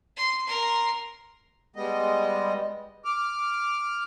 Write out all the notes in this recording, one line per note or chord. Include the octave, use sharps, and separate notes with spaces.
C6
A#4 C6
G3 G#3 B3 D#5
D6 F6